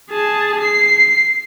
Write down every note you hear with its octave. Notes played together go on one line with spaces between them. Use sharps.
G#4 A5
C7